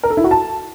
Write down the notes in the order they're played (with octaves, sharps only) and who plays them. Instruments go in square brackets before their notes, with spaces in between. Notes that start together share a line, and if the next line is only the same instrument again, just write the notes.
[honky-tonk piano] A#4
A4
E4
F#4
A5